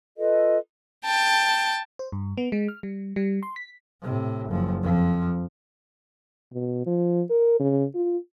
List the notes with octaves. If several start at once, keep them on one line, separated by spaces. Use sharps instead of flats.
F4 A4 B4 D#5
G5 A5
C5
G2
B3
G#3
F6
G3
G3
C6
B6
A2 C3
F#1 F3
F2 F3
B2
F3
A#4
C#3
F4